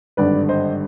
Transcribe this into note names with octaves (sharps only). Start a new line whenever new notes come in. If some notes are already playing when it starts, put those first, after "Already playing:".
G#1 G2 D3 B4 D5
C5 D#5